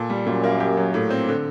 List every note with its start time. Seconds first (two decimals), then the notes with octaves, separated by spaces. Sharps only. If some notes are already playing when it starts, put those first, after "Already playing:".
Already playing: A#2 A4
0.10 G3
0.26 F#2 A#2
0.44 A#3
0.60 G4
0.77 F#3
0.94 A2
1.10 C4
1.28 D3